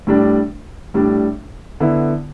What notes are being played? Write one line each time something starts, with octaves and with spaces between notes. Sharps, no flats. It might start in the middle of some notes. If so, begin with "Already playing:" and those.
A2 G3 D4
A2 G3 D4
D3 B3 E4